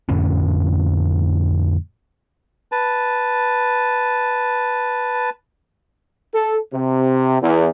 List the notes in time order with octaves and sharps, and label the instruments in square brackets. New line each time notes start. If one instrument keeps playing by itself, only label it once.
[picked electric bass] F2 A2 D3 C#4
[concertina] B4 A5
[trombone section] A4
C3
E2